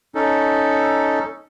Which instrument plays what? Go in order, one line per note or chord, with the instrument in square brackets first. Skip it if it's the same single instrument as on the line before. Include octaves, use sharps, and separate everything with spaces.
[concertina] C#4 D#4 A4